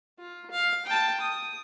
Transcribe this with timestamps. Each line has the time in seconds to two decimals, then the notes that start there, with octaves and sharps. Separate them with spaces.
0.19 F4
0.51 F5
0.86 G5 A5
1.21 D#6